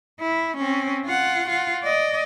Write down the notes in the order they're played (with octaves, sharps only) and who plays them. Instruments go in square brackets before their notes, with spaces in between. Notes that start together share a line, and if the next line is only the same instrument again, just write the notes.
[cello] E4
C4 C#4
F4 F#5
F4 F#5
D5 D#5